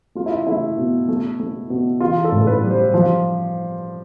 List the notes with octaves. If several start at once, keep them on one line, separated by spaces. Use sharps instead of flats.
A3 F4
E4
A3 E4
B2
A3
A3
B2
E3 F4
A4
A2
A4
B4
G3
C5
F3